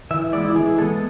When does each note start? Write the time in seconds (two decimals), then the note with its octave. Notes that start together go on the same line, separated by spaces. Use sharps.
0.11 E3 E5
0.33 G#3 B3 D5
0.45 E4
0.55 E3 G#4
0.78 G#3 B3 A4